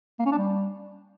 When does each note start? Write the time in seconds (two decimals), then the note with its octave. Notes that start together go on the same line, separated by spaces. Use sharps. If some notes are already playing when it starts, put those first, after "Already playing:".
0.19 A#3
0.26 C#4
0.32 D4
0.38 G3